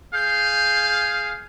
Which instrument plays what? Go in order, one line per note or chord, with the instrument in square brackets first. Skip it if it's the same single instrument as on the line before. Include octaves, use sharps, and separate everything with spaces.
[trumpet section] G#4 F5 [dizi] G6